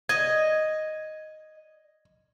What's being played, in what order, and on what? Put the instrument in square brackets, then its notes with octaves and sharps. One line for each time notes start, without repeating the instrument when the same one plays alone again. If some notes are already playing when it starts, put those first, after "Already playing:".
[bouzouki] D#5 [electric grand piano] G#6